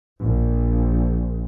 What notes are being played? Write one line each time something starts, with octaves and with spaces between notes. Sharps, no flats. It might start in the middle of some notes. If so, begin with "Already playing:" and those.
A#1